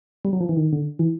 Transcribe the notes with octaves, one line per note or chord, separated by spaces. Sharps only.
G3
F#3
F3
E3
D#3
D3
E3